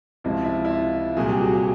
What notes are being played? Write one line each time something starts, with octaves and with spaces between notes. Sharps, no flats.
C#2 C3 F3 E4
F4
E4
E4
F4
C2 A#2 F#3 G#4
G4
F#4
G4